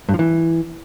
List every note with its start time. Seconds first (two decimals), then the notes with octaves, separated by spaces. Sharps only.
0.09 G2
0.14 F3
0.19 E3